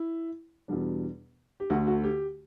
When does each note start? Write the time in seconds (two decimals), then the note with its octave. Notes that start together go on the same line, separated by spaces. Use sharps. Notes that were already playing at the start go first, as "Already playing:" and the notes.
Already playing: E4
0.68 E2 B2 G3 D4
1.60 G4
1.70 D2 D3 A3 F#4
1.87 F#4
2.04 G4